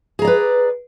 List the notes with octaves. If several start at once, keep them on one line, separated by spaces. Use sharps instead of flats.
G#4 B4 D5 A#5